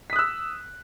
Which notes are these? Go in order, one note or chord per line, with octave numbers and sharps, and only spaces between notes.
D#6 E6 F#6 B6